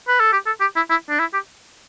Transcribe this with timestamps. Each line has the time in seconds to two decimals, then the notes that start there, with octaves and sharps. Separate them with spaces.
0.08 B4
0.20 A4
0.33 G4
0.46 A4
0.61 G4
0.76 E4
0.90 E4
1.09 D4
1.20 E4
1.34 G4